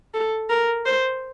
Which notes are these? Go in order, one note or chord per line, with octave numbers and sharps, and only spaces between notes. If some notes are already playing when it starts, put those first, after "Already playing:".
A4
A#4
C5